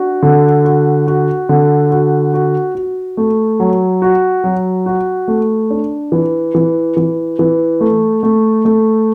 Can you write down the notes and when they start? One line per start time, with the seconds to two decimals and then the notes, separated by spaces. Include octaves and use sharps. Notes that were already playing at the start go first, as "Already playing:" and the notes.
Already playing: D4 F#4
0.22 D3
0.65 F#4
1.07 F#4
1.49 D3
1.91 F#4
2.34 F#4
2.75 F#4
3.17 A3
3.60 F#3
4.02 F#4
4.44 F#3
4.86 F#4
5.28 A3
5.70 D4
6.12 E3
6.55 E3
6.97 E3
7.39 E3
7.81 A3
8.23 A3
8.65 A3